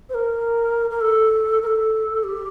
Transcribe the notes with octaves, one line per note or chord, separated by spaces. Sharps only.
C5
A#4
A#4
A4
A#4
A4
G4